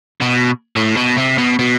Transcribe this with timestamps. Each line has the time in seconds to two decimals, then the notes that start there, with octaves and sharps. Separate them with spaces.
0.22 B2
0.77 A2
0.97 B2
1.18 C3
1.38 B2
1.59 B2